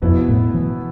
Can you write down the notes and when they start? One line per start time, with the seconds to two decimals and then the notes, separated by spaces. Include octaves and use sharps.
0.02 F2 B2 B3 E4
0.28 A2
0.54 E3